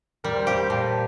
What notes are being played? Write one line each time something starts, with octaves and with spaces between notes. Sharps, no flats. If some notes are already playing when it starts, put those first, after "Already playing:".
G3 A#4
C5
G4 F5
G5
A#2 A5